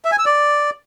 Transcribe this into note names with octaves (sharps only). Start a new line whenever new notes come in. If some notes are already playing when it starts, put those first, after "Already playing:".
E5
G#5
E6
D5